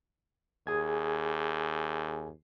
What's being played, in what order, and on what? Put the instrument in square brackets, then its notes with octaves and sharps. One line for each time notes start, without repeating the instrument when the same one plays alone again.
[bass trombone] D#2 [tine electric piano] G#4 G#5 G#6